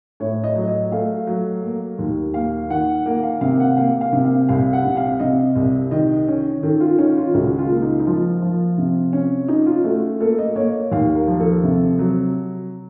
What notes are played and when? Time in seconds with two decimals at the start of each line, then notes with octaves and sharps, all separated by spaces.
0.20 A2 C#5
0.44 D#5
0.56 F#3
0.68 D#5
0.92 A3 F5
1.27 F#3
1.63 A#3
1.99 D#2
2.34 A#3 F5
2.70 D#3 F#5
3.06 A#3 F#5
3.23 F5
3.41 C3 F5
3.60 F#5
3.77 A#3 F5
4.01 F5
4.12 C3
4.25 F5
4.49 C2 F5
4.73 F#5
4.85 C3
4.97 F5
5.20 C3 D#5
5.56 C2
5.91 D#3 D#5
6.28 C#4
6.63 D#3 A4
6.80 F4
6.98 C#4 D#4
7.17 F4
7.34 C#2 F#4
7.58 F4
7.70 A#3
7.82 D#4
7.99 D#4
8.06 F3 F4
8.42 F3
8.78 C3
9.13 C#4
9.48 C#4 D#4
9.66 F4
9.84 A3 F#4
10.20 A#3 A4
10.38 D#5
10.56 A#3 C#5
10.91 D#2 F5
11.15 A#4
11.28 F3
11.40 A4
11.63 C3
11.99 F#3